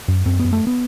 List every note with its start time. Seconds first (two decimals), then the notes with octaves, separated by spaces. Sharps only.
0.08 F#2
0.26 F#2 C4
0.40 F#2 B3
0.53 A3
0.67 B3